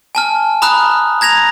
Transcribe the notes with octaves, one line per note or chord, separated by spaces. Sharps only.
G#5 A5 F6
A#5 B5 D#6 F6 F#6
A#5 G#6 A#6 F7